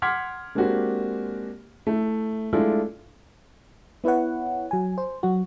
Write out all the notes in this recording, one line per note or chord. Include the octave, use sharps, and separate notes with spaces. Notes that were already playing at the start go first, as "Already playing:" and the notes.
F#5 C6 D6 F6 G#6 B6
G#3 A#3 C4 D4 F#4 G4
A3 E4
G#3 A3 D4 E4 F4 A4
B3 E4 B4 C#5 F#5
F#3 G#5
C5
F#3 F#4